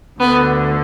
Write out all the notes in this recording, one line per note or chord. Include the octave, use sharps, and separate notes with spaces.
D2 D3 B3